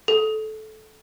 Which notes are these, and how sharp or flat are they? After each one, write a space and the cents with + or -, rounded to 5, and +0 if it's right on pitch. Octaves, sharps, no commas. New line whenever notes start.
A4 -20